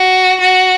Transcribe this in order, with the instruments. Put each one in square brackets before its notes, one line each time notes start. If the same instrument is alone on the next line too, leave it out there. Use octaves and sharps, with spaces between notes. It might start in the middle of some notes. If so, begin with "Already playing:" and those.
Already playing: [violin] F#4
F#4